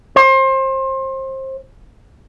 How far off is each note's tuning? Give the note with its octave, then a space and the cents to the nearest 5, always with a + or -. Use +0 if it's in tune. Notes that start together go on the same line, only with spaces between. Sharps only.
C5 +30